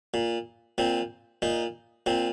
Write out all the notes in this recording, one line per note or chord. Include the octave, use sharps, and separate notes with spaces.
A#2
A#2 C4
A#2 D#4
A#2 C4